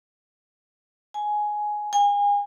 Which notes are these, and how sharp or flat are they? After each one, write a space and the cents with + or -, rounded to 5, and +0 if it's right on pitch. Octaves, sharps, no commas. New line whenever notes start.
G#5 +10
G#5 -35